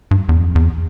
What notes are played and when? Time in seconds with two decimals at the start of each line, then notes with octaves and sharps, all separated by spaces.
0.11 G2
0.29 E2
0.41 F2
0.55 E2